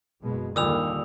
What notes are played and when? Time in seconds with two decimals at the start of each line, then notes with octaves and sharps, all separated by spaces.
0.22 F#1 B2 G#3
0.56 D#2 A#2 D3 G3 D#6 E6 F7